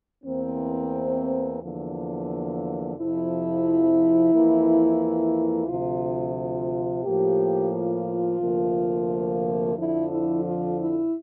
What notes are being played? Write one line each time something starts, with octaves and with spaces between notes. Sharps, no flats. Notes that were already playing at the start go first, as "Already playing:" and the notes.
E2 E3 A#3 C4
E2 D3 F3 A#3
F2 C3 F3 E4
F2 E3 A#3
D2 C3 F3 F4
F4
A2 F3 A#3 G4
F4
D2 C3 F3 A#3
F2 D3 F3 E4
E4
F4
E4